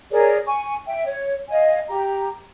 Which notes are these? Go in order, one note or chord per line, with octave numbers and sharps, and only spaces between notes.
G#4 A#4 C#5 D5
G#5 C#6
E5 G5
C#5
D#5 F5 G#5
G4 A#5